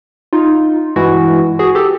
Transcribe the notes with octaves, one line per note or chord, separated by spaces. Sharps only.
D#4 F4
G2 E3 G#3 E4 F#4
F#4 G#4
G4 A4